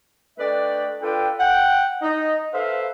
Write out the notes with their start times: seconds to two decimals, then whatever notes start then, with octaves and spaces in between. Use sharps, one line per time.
0.38 A3 D4 B4 D5 D#5 G5
1.03 D4 F4 A4 B4 G5
1.40 F#5 G5
2.02 D#4 D#5
2.54 A4 B4 C5 E5 F5